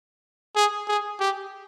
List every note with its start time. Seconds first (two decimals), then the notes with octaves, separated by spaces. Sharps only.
0.56 G#4
0.88 G#4
1.20 G4